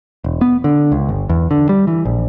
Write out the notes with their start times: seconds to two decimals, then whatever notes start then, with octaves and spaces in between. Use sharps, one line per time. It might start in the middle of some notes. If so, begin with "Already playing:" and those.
0.24 E1
0.41 B3
0.64 D3
0.92 C#2
1.09 G1
1.29 E2
1.51 D3
1.69 G3
1.87 E3
2.05 A#1